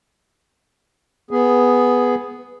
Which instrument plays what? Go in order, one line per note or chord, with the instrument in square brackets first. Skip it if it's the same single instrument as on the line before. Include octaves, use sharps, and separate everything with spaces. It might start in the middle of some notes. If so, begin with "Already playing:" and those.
[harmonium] B3 G#4